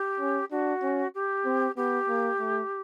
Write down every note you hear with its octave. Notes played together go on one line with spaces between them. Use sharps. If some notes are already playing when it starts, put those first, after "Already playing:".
Already playing: G4
C#4
D4 F#4
C#4
G4
C4
B3 G4
A#3
A3